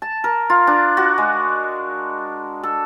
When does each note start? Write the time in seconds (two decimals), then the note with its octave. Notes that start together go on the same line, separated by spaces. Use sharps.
0.02 A5
0.24 A#4
0.50 F4
0.67 D4
0.97 F#4
1.18 G#3
2.63 A4